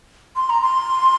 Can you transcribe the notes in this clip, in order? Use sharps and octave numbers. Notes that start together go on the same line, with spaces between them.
C6
A#5
C6